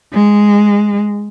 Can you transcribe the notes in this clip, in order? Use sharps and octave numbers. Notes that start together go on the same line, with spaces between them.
G#3